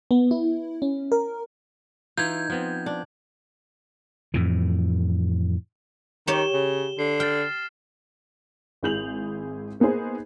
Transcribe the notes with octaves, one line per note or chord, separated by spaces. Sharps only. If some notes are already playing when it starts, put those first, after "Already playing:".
B3
E4
C#4
A#4
E3 D#4 F4 G6 G#6
F3 B3 C4
D4
F2 A2 E3
D#3 G4 C#5 E7 G7
C#3
D3 C7
G5 F6 A6
G#1 E4 G#4 G6 F7 F#7
A#3 B3 D#4 G#4 C5